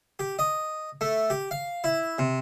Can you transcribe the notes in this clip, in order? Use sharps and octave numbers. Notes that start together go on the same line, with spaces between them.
G4
D#5
A3
G4
F5
E4
C3